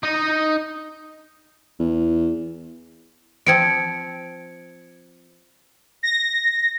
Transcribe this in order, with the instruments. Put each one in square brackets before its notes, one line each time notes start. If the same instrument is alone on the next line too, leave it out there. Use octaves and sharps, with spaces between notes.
[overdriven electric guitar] D#4 D#5
[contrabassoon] E2
[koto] F3 C4 F4 [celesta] G#6 C#7 D7
[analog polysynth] A#6